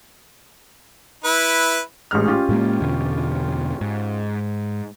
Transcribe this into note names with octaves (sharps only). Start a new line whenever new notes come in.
E4 B4
A1 G#2 F6
C#4 F4 G4
A2 G#3 A#3
E2 B2 D3
G#2